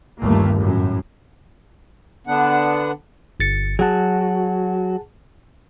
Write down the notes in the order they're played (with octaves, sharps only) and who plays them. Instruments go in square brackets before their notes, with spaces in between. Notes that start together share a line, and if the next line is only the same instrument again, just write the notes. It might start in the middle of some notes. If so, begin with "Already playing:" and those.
[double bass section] G1 D#2 A3 A#3
F#2 A2
[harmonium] D3 B3 D4 F#5
[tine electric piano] G1 A6 C#7
[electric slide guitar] F#3 F#4 [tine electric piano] G#4 F#5 A5